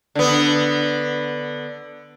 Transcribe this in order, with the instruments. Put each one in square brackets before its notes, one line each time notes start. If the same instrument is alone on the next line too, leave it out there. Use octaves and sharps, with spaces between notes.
[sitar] D3 B3